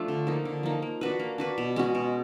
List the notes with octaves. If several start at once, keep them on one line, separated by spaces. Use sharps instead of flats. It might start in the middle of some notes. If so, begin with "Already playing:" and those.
Already playing: F3 A3 D4 F4
D3
F3 A#3 D#4
D3
F3 A#3 D#4
A#3
D4 F#4 B4
A#3
D4 F#4 B4
B2
G#3 C#4 F#4
B2